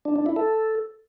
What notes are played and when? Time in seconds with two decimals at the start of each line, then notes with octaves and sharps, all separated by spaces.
0.05 D4
0.16 D4
0.26 E4
0.36 A4